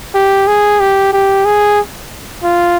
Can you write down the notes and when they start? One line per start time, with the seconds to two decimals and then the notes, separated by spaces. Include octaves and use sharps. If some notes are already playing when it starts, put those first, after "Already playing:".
0.15 G4
0.47 G#4
0.80 G4
1.13 G4
1.45 G#4
2.43 F4